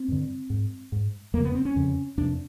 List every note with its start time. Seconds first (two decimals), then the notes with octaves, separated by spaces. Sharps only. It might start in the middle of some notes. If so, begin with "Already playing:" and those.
Already playing: C4
0.08 G2 D3
0.50 G#2
0.92 G#2
1.34 F2 A#3
1.38 C#3
1.44 B3
1.55 C4
1.65 C#4
1.76 F2 C#3
2.18 F2 C3 D4